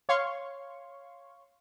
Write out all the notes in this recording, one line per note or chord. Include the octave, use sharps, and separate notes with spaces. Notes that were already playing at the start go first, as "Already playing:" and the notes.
C#5 F5 C6 C#6